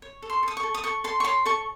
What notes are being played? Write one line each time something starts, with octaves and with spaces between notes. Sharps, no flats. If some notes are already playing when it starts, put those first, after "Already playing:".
C#5
A4
C6
A4 D#6
C#6
A4
D#6
A4 C#6
A4 C6
C#6
C#5 C6
A4 C#6